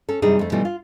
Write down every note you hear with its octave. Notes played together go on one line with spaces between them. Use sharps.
C#4 A4
F#2 C3 E3 G3 D#4 G#4
F2 A3
B2 E3 F3 G3 A3
F4